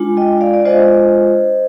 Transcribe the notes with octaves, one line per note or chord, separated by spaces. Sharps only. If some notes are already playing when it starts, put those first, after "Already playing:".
Already playing: G#3 D4 F4
D#5 G5
D5 F5
D5
G#3 D4 F4 C5 D#5